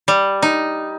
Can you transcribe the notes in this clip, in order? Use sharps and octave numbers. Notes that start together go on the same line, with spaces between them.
G3
D#4